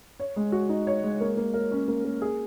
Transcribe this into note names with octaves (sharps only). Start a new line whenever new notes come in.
C#5
G#3
F#4
D#4
C#5
G#3
A#3
A#3
A#4
C#4
A#3
A#3
G#4